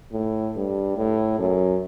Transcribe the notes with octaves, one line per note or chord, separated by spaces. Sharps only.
A2
G2
A2
F#2